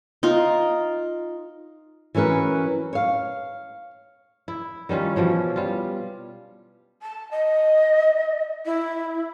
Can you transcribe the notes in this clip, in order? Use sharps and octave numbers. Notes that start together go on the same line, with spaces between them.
D#4 F4 A#4
E3 F#3 C#4 A#4 B4
C#5 F5
E4
D#3 G3 C#4 F4
B2 E3 F3 C#4
G3 F4
A5
D#5
E4